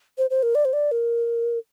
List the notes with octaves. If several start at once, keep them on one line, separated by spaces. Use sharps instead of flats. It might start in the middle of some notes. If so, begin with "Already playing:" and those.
C5
C5
A#4
D5
C5
D5
A#4